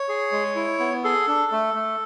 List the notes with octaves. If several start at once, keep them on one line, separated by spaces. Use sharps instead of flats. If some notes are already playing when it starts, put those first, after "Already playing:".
Already playing: C#5
G#4
G#3
E4
B3
G#4 A4
D4
A3
A3